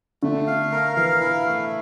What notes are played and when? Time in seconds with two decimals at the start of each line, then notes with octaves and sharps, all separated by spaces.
0.23 D3 A3
0.47 F5
0.72 A#4
0.96 E3 F5
1.21 E4
1.46 A3